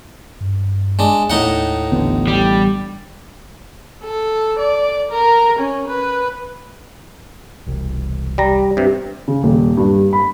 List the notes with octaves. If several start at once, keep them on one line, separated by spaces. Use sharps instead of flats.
G2
G#3 D4
D#2 A2 D#4 F#5
A1 D3 B3
G3
A4
D5
A#4
C#4
B4
E1 C2
G3 A#5
G2 C3
C#3
D#1
G2
B5